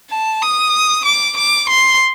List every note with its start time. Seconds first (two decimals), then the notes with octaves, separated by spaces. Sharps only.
0.10 A5
0.42 D#6
1.06 D6
1.37 D6
1.70 C6